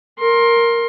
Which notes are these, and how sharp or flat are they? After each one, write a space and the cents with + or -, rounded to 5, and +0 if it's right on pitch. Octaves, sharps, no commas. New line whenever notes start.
A#4 +0 C6 +20